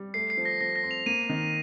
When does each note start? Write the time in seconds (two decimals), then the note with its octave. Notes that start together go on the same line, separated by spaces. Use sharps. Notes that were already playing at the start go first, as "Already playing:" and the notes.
Already playing: G3
0.14 A3 C7
0.30 C7
0.37 F3
0.45 A#6
0.61 F3 A#6
0.76 A#6
0.83 C4
0.91 F7
1.06 A#3 D#7
1.29 D#3